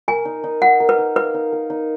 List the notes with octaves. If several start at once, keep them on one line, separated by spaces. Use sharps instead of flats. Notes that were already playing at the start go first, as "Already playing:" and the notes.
A#4 G#5
D#4
D#4
D#4 F#5
A#4
B4
D#4
B4 F5
D#4
A#4
D#4